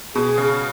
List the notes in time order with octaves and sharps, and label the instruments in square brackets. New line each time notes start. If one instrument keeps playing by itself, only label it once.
[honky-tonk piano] B2 [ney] G#4
[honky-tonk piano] C#3